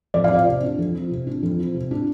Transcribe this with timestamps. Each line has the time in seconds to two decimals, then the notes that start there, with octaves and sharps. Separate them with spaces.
0.14 F2 D5
0.24 F5
0.30 F3 D5
0.46 C3
0.62 D4
0.78 F2
0.95 F3
1.11 C3
1.27 D4
1.43 F2
1.59 F3
1.74 C3
1.91 D4